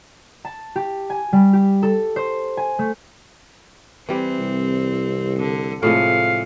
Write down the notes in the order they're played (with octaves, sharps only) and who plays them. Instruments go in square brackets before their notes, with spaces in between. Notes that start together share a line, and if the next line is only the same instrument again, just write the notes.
[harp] A5
G4
G#5
G3
G4
A4
C5
G#5
A3
[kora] E3 G3 [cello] C4
[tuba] C2
[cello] D3
[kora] A2 F3 G#3 [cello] C3 [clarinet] F5